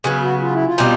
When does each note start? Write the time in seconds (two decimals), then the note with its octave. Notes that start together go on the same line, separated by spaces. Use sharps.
0.04 C#3 F#3 B3
0.22 F#4
0.41 F4
0.53 E4
0.66 F4
0.78 B2 G3 C4 D#4